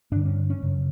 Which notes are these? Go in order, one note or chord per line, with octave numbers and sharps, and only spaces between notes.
G2 D3 D4
C#4
C#4
F#2 C#3